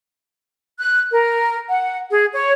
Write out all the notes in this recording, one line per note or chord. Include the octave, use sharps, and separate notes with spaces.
F#6
A#4
F#5
G#4
C#5